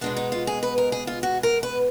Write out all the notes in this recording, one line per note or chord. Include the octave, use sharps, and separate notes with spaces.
B2 G#3 B3 D4
D#4
F4
G#4
B4
A#4
G#4
F4
F#4
A#4
B4